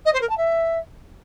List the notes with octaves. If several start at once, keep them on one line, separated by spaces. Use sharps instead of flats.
D#5
C5
A#4
A5
E5